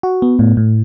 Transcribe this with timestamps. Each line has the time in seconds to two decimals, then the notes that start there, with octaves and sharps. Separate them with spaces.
0.03 F#4
0.22 B3
0.39 A2
0.57 A2